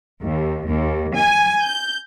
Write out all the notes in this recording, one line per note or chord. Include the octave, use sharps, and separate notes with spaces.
D#2
D#2
G#5
G6